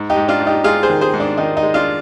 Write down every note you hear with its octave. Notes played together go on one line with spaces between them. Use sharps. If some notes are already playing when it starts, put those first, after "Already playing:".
Already playing: G#2
D#4 G4
G#2
D4 F4
G#2
D#4 G4
G#2 F4 G#4
G#4 C5
D#3
G#4 C5
G#2
D4
D#3 D#4
D#4
G#3
D4 F4